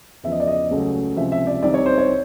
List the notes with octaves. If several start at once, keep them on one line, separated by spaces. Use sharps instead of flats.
E2 C#3 F3 E5
D#5
D5
D#5
C#2 C#3 F#3 A3
C#2 C3 F3 E5
E5
D5
C2 C3 D#3 D5
C#5
C5
C#5